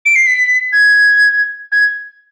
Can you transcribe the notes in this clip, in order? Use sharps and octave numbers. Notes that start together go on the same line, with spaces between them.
D7
C7
B6
G#6
G#6